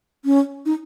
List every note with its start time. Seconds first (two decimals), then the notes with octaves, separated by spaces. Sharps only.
0.25 C#4
0.66 D#4